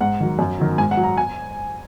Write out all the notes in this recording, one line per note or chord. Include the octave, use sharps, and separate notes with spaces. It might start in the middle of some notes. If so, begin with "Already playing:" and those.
G#2 F#5
D#3 F#3
F#2
D#3 F#3
G#2 G#5
F#5
F#3
A#5
G#5